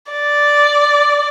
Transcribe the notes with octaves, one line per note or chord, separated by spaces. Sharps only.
D5